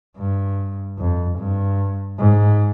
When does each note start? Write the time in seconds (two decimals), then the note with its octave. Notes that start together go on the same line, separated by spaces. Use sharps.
0.18 G2
0.98 F2
1.39 G2
2.19 G#2